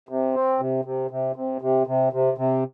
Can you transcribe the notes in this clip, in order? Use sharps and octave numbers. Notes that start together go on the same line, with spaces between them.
C3
C4
C3
C3
C3
C3
C3
C3
C3
C3